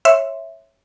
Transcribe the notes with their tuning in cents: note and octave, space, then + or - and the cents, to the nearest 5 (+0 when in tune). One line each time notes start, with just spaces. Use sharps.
C#5 -15 E5 +0 C6 +0